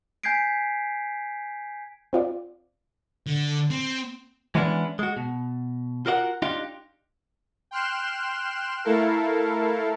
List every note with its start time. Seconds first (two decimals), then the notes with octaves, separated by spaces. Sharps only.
0.24 G#5 G6 G#6 B6 C7 D7
2.13 C4 F4 D5
3.27 D3
3.70 C4
4.55 E3 G#3 B3 C#4 D4 E4
4.99 G#3 F#4
5.17 B2
6.06 F4 F#4 A#4 D5 F#5
6.42 D4 D#4 F4 G4
7.71 G5 C6 F6 F#6 E7
8.84 A3 E4 A4 A#4 F5